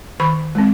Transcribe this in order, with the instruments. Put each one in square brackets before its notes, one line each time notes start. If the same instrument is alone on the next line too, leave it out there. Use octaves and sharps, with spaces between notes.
[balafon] D#3 B5 C#6
G#3 C4